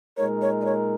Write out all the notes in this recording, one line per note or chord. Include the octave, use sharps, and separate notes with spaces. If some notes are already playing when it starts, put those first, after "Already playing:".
A#2 G#3 D#4 A#4 C#5
C#5
D#5
C#5